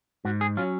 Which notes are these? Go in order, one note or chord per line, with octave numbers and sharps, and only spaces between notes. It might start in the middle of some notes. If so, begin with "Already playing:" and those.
G#2 F#4
G#4
F#3 C#4 F4